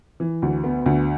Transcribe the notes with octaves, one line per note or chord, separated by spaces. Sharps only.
E3
D2
B3
D2